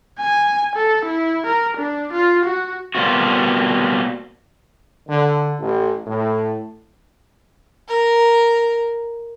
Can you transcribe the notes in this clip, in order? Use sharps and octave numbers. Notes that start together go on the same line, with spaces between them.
G#5
A4
E4
A#4
D4
F4
F#4
B2 G3 A#3 C4 F4 F#4
D3
A1
A2
A#4